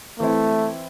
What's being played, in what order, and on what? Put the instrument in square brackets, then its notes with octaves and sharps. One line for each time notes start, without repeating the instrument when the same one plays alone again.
[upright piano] E3 C4 E4 [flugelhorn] A3